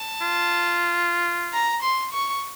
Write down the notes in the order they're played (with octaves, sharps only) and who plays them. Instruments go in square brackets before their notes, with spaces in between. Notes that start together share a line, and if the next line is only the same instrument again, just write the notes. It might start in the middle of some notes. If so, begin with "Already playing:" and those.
Already playing: [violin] A5
[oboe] F4
[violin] A#5
C6
C#6